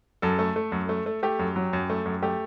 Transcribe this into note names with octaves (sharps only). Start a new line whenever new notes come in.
F#2 A4
A3
A3
F#2
A3
A3
A3 G4
F#2
F#3
F#2
A3
F#2
A3 G4